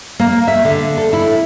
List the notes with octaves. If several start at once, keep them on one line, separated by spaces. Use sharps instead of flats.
A#3
E5
D3
A4
E4